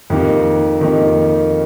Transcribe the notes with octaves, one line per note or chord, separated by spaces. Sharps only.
F2 D#3 A#3 D#4 G4
F2 D#3 A#3 D#4 G4